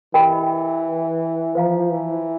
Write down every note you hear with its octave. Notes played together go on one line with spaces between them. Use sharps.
E3 G4 A#4 D#5 G5 B5
F3 C5 F5 A#5
E3